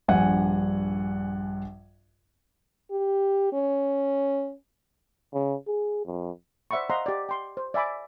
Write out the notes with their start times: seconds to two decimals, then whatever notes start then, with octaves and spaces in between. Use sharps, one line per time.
0.08 A#1 G2 F#5 G#5
2.91 G4
3.53 C#4
5.34 C#3
5.68 G#4
6.06 F2
6.71 C5 D5 E5 F#5 B5 C#6
6.90 C5 D#5 F5 F#5 A#5 C6
7.06 G4 D5
7.29 G5 C6
7.57 C5
7.74 D5 E5 G#5 B5 D6